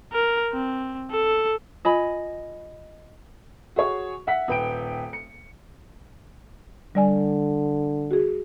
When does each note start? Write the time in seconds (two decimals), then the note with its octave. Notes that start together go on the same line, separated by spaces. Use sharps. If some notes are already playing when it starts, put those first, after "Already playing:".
0.13 A#4
0.53 C4
1.11 A4
1.85 F4 D#5 G#5 B5
3.76 F#4 G#4 C#5 C#6
4.27 E5 F#5 B6
4.48 D#1 B4 G5 D7
5.13 C#7
6.95 D3 G3 D5 G#5
8.11 F#4 G#4